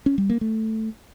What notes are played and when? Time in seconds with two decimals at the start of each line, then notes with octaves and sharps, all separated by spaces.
0.06 C#4
0.18 G3
0.30 A#3
0.41 A3